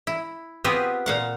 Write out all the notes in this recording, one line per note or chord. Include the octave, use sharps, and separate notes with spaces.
E4
B3 C4 F4 G4 G#4 B4
A#2 F5 F#5